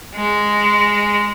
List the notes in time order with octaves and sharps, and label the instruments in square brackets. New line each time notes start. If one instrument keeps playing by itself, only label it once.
[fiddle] G#3